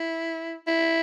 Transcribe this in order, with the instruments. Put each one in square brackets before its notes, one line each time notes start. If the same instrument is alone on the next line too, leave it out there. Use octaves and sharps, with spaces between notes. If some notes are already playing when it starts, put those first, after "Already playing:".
Already playing: [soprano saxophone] E4
E4